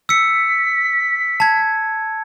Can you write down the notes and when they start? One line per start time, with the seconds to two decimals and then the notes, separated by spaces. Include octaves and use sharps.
0.09 E6 B6 C#7
1.40 A5 G#6